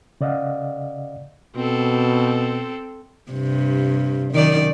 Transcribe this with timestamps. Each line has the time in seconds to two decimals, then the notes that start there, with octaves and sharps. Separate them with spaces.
0.21 C#3 D5 D#5 F5 F#5
1.56 B2 C4 A4
3.32 G2 C3
4.33 F#2 D#3 D5